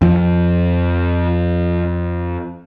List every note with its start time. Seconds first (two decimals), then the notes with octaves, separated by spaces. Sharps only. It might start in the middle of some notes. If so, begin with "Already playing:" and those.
0.02 F2 F3